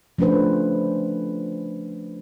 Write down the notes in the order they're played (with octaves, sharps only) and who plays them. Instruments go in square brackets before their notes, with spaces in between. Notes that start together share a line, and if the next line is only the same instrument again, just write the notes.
[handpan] F3 A3 C#4 D4 B4 C5